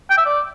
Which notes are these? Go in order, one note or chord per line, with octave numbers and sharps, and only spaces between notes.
G5
E5
D5